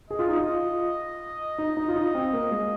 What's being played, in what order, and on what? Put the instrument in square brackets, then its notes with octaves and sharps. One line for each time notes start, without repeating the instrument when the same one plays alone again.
[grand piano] G#4 [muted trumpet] D#5
[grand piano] F4
D#4
F4
D#4
D#4
F4
D#4
C4
A#3
G#3